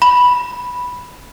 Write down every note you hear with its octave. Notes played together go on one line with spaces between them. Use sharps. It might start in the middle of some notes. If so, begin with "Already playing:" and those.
B5